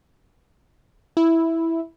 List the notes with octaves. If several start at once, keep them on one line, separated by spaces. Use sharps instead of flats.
E4